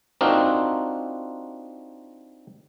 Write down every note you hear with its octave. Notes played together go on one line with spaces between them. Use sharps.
C4 D4 D#4 F4 F#4 A#4